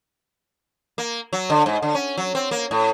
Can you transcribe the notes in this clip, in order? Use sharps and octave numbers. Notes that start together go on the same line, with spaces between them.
A#3
F#3
D3
G#2
D3
C#4
F#3
C4
A#3
A2